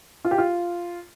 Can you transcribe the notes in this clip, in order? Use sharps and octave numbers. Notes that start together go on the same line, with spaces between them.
F4
G4
F4